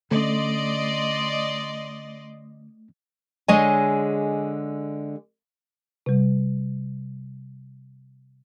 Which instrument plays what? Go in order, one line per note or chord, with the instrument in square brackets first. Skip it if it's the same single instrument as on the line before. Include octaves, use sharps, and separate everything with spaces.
[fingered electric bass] D3 C#4 [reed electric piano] A3 [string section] D5 D#5 C6
[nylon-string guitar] D3 G#3 G#4 C#5 D#5 G#5
[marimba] C3 G3